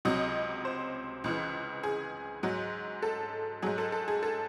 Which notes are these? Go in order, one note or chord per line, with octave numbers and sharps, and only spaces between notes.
C#2 C3 F#3 D#5
C5
C#2 C#3 E3
G#4
G#2 F#3
A4
G#2 F#3 G#4
A4
A4
G#4
A4